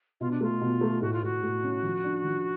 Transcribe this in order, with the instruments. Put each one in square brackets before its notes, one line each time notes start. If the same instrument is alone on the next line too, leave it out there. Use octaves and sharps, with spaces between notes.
[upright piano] B2 [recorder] F4
[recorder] D4
[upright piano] A3 [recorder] F4
[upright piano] B2
A3
[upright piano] A2 [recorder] F#4
[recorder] F4
[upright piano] A2 [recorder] F#4
[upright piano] A2
C#4
F3
D4
F3